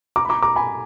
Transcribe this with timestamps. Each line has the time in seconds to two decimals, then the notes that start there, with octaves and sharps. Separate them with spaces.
0.16 A#5 D6
0.25 B5
0.29 A#5 D6
0.43 A#5 D6
0.56 G#5 B5